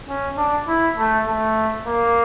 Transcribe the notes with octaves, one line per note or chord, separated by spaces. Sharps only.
C#4
D4
E4
A3
A3
A#3